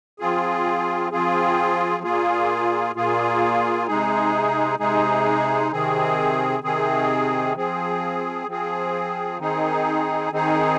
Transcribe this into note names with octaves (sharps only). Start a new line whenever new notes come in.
F3 C4 F4 G#4
F3 C4 F4 G#4
A#2 A#3 F4 G#4
A#2 A#3 F4 G#4
C3 G#3 D#4 G#4
C3 G#3 D#4 G#4
C3 D#3 C4 G#4
C3 D#3 C4 G#4
F3 C4 G#4
F3 C4 G#4
D#3 C4 D#4 G#4
D#3 C4 D#4 G#4